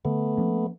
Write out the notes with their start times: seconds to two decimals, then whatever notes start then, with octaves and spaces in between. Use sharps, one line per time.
0.05 D3 A3 B3
0.37 F3 A#3 C#4